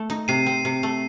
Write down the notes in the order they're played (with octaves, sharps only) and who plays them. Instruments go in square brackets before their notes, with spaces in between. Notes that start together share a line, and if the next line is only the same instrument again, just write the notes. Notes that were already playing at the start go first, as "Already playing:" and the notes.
Already playing: [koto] A3
D#4
[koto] C3 [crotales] C7 D#7
[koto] C4
C3
A3